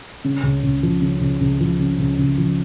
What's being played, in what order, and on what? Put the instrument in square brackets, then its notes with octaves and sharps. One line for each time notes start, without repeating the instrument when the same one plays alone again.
[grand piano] C#3
C#2
C#2
F3
C#3
C#2
C#2
F3
C#3
C#2
C#2
F3